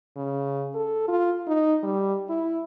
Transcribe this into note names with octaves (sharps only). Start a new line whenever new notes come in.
C#3
A4
F4
D#4
G3
E4